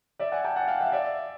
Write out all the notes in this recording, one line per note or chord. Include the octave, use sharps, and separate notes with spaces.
D5 E5
F#5 G#5
G5 A5
F#5 G#5
F5 G5
E5 F#5
F5
D5 E5